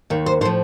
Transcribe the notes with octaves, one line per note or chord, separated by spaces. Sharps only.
D#2 D#3
C5
A2 F3 C5